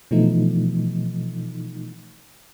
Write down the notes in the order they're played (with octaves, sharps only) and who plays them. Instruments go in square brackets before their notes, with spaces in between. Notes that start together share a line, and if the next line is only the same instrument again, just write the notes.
[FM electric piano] B2 E3 F3 A3 D#4